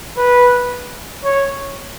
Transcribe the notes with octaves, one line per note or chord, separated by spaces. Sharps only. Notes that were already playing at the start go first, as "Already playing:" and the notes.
B4
C#5